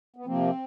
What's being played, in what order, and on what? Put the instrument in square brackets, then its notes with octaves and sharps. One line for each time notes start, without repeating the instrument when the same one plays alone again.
[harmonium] B3
C3 F3 A#3 C4